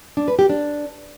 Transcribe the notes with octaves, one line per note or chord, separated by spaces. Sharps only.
D4
B4
G4
D4